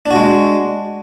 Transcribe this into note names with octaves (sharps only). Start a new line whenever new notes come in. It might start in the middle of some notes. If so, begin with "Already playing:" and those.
G#3 D4 F#4